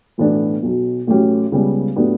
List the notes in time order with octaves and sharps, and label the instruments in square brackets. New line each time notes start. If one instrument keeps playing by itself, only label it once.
[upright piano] B1 A2 E3 B3 D4
B1 B2 F#3
A1 A2 F#3 C#4 G4
C#2 C#3 G3 B3
A2 F#3 B3 D4 G4